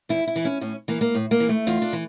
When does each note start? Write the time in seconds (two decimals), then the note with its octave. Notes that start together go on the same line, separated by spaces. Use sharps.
0.09 E2 E4
0.27 E4
0.36 E3
0.45 C#4
0.61 A2 C#4
0.88 E3 A#3
1.01 A#3
1.15 A2
1.31 A#3
1.40 E3
1.49 A3
1.67 E2 F4
1.82 D4
1.93 E3